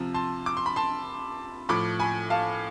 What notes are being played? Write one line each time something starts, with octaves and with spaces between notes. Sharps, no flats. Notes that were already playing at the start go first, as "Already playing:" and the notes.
Already playing: C3 F3
A5 C6
D6
C6
B5
A5 C6
A2 F3 B5 D6
G#5 B5
F5 A5